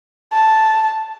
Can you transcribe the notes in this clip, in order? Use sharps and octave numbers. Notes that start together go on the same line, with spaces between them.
A5